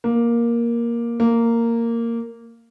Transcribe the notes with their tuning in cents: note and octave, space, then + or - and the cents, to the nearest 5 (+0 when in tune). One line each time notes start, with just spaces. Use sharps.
A#3 +10
A#3 -10